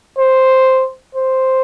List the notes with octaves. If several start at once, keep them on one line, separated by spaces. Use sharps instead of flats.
C5
C5